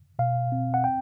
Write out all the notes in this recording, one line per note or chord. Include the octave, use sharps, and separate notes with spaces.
B2 F5
C4
F#5
G5